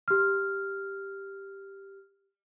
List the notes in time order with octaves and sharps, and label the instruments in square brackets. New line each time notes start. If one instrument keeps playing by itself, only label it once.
[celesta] G4 F6